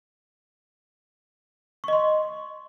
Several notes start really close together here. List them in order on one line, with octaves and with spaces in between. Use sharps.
C#6 D#5 C6